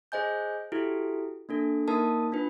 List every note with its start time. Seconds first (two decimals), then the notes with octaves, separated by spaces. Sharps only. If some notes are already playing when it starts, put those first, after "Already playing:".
0.12 G#4 C5 D#5 G#5 G6
0.72 E4 F#4 G4 A4
1.49 A#3 D4 A4
1.88 A#3 D#4 A#4 A5 D#6
2.32 D4 F4 B4